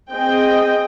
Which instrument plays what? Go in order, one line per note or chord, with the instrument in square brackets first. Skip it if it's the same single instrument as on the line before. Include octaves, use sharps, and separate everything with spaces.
[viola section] C4 G#4 D#5 G5